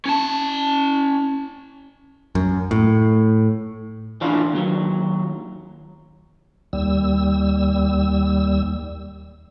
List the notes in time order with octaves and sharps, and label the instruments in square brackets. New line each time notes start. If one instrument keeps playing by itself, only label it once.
[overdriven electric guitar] C#4 A5
[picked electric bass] F#2
A2
[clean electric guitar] E3 C#4 D4 F4
D#2 F#3
[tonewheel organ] D#2 G3 E6